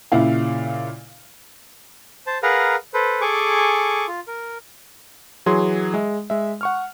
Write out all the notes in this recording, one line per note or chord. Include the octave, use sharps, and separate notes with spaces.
A#2 C#3 E4 F5
C5 A5
G#4 A#4 B4 F5 F#5 A#5
A4 B4 C5
G#4 A4 G#5 C#6 D6
F4
A#4
E3 F#3 G#4 C6
G#3 E5
G#3 E5
F#5 C#6 F6